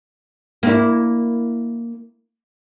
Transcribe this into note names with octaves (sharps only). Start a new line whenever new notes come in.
A#3 E4